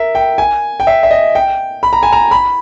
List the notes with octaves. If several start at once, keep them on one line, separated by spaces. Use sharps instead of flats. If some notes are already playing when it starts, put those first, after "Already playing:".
Already playing: A#4 E5
G5
G#5
G5
E5
E5
D#5
G5
B5
A#5
G#5
A#5
B5